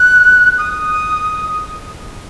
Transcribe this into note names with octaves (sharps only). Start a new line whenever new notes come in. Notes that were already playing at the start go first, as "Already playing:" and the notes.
Already playing: F#6
D#6